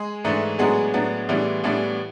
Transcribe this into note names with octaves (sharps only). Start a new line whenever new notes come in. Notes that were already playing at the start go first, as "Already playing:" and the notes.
Already playing: G#3 G#4
G#2 E3 A3 D4
A2 F#3 G#3 B3 D4 G#4
A2 F#3 B3 D4
A2 E3 G3 B3 D4
A2 E3 G3 B3 D4